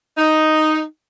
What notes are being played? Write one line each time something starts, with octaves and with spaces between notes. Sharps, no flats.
D#4